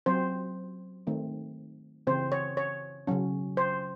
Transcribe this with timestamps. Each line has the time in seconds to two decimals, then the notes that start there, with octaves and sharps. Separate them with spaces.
0.06 F#3 C4 C5
1.07 D#3 A3 C4
2.07 C#3 E3 C4 C5
2.32 C#5
2.57 C#5
3.07 C#3 F#3 C#4
3.57 C5